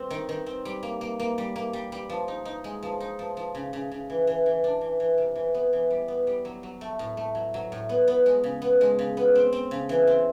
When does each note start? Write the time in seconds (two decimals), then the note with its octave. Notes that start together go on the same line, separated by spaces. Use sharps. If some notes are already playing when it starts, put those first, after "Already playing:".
Already playing: G3 C4
0.10 D#3
0.29 D#3
0.46 C4
0.65 G3
0.83 A#3
1.01 A#3
1.20 A#3
1.38 G3
1.56 A#3
1.73 G3
1.92 G3
2.09 F3
2.28 D#4
2.45 D#4
2.64 G#3
2.83 F3
3.00 D#4
3.19 F3
3.37 F3
3.55 C#3
3.73 C#3
3.92 C#3
4.10 E3
4.27 E3
4.46 E3
4.64 D4
4.81 E3
5.00 E3
5.18 C3
5.36 E3
5.54 B3
5.73 E3
5.90 G3
6.08 B3
6.27 G3
6.45 F#3
6.63 F#3
6.81 A3
6.99 A2
7.17 A3
7.35 F#3
7.54 F#3
7.72 A2
7.89 B3
8.08 B3
8.26 G#3
8.44 C#3
8.62 B3
8.81 G#3
8.99 C#3
9.17 B3
9.35 C4
9.53 C4
9.71 C#3
9.89 E3
10.07 C4